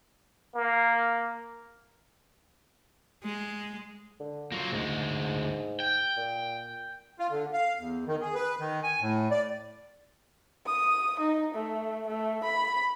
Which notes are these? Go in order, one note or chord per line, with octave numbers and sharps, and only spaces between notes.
A#3
G#3
D3
F#3 A#3 F4
D2 G#2 G#3
G5
A#2
F4
D3
F5
E2
D#3
G#4
B4
D#3
G#5
A2
D5
D#6
D#4
A3
A3
B5